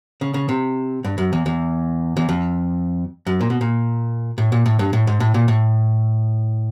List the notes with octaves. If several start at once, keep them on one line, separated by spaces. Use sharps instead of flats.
C#3
C#3
C3
G2
F#2
E2
E2
E2
F2
F#2
A#2
B2
A#2
A2
A#2
A2
G2
A2
G#2
A2
A#2
A2